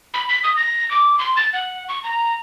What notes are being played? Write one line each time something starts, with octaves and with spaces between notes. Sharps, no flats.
B5
B6
D#6
A#6
D6
C6
A6
F#5
C#6
A#5